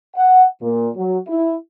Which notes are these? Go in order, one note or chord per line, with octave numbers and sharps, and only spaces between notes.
F#5
A#2
F#3
E4